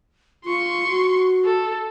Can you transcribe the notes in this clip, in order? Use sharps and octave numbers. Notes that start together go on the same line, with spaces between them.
F4 C6 C#6
F#4
A4